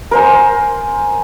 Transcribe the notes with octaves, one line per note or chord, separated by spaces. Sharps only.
A#4 C5 G#5